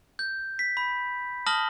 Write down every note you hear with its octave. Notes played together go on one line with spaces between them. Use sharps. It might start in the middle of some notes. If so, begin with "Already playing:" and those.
G6
B6
B5
A5 D#6 F6 A#6 F#7 G7